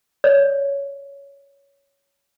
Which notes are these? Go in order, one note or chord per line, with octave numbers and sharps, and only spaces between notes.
C#5 D5